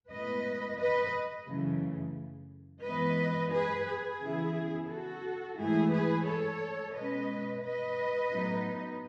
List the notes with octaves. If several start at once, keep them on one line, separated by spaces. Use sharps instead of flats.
A2 G#3 B3 B4 D#5
B4 D#5
F#2 C#3 E3 A3
G#2 E3 B3 B4 D#5
G#4 B4
G#4
C#3 E3 B3 E4
F#4 A4
G#2 E3 A3 E4 G#4
G#4 B4
A4 C#5
B2 G#3 C#4 B4 D#5
B4 D#5
A2 F#3 B3 D#4